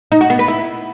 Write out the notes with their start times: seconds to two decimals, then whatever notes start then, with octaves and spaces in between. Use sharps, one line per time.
0.12 D#4
0.21 F#4
0.30 B3
0.39 B4
0.48 E4